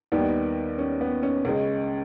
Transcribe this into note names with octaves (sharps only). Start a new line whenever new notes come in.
D#2 D#3 G3 B3
C#4
B3
C#4
C#2 C#3 G#3